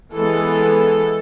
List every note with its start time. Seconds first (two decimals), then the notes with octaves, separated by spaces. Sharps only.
0.14 E3 G#3 B3 A4